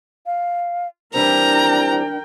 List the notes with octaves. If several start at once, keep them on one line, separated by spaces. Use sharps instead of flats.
F5
E3 G3 C4 D4 A#4 G5 A#5